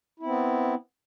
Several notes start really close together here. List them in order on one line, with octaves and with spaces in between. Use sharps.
E4 C4 B3